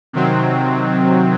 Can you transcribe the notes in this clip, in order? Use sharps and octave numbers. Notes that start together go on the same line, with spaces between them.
C3 D#3 F#3 C4